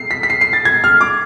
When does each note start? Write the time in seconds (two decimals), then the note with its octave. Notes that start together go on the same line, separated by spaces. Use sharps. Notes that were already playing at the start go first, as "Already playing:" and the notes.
Already playing: C7
0.11 B6
0.23 B6
0.30 C7
0.41 C7
0.53 A6
0.65 G#6
0.84 F6
1.01 D6